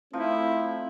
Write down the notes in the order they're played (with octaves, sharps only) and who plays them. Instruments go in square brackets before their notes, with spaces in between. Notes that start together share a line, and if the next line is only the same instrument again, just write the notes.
[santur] F3 D#4 [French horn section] A3 C4 [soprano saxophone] E4